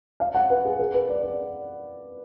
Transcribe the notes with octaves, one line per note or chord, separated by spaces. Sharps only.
F5
F#5
B4
G#4
A#4
B4
D5
D5